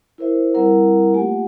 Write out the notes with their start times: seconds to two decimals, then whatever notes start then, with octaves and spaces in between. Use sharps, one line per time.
0.18 E4 A#4 C5 E5
0.54 G3 C4 E4 A#4 F#5 A#5
1.14 A3 A#3 F4 G4 F#5 G#5